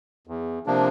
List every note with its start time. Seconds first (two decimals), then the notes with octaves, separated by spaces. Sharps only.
0.27 E2
0.66 C3 F3 A#3 D4